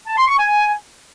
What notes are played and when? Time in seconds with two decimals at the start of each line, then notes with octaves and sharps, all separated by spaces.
0.07 A5
0.18 C6
0.28 C#6
0.39 G#5